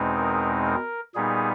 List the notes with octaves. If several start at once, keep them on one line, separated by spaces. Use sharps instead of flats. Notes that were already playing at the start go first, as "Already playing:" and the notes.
Already playing: E2 B2 G#3 C4 D#4
A#4
A#4
A#2 G3 B3 D#4 G#4